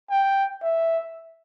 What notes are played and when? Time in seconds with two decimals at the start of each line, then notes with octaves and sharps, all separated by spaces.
0.10 G5
0.63 E5